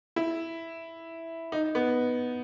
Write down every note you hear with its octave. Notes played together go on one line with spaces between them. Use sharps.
E4
D#4
B3